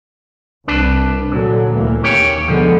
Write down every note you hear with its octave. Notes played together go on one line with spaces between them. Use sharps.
C2 D4 B4 A5
A#2 D3 F#3
D2 E3 A#3
D#2 C#4 G4 C#5
D3 F3 G#3 B3